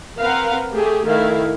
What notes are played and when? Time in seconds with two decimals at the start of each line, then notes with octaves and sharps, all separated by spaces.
0.21 C4 A#4 B4 F5 F#5
0.75 A3 G4 G#4
1.08 D#3 A3 E4 F5